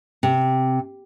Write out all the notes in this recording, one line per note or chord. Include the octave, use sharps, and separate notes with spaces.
C3